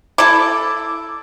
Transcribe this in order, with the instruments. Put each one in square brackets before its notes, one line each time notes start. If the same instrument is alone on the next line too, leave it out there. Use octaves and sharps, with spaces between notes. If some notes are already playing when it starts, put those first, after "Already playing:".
[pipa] E4 A4 [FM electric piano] D6